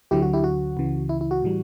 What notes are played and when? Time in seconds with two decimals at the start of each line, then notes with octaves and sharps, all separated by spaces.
0.11 D2 D3 F#3 E4 G4
0.22 F#4
0.33 E4 G4
0.44 F#4
0.77 C#2 C#3 E3
1.09 E4
1.21 E4
1.31 F#4
1.42 A2 E3 G3